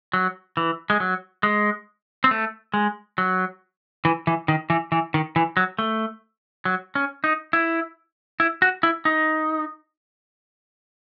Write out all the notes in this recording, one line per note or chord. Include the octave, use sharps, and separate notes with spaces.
F#3
E3
G#3
F#3
G#3
C4
A3
G#3
F#3
E3
E3
D#3
E3
E3
D#3
E3
F#3
A3
F#3
C#4
D#4
E4
E4
F#4
E4
D#4